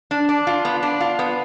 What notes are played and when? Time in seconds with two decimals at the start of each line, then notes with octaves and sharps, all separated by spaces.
0.11 D4
0.29 D4
0.47 F4
0.65 B3
0.83 D4
1.01 F4
1.19 B3